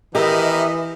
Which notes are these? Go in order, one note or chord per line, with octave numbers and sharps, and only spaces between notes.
D#3 E3 B3 D#4 G4 A#4 D#5 E5